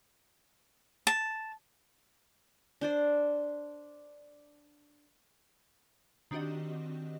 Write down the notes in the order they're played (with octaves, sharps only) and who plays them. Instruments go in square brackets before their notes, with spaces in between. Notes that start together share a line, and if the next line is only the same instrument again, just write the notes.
[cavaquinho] A5
[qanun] D4 C5 D5
[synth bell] D#3 C4 D4 F#4 G4 D#5